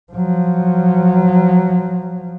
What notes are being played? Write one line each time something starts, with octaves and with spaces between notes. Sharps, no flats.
F3 F#3